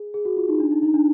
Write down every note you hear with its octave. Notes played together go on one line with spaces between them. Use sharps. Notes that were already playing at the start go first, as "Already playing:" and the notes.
Already playing: G#4
G#4
F#4
F4
D#4
D4
D#4
D#4
D4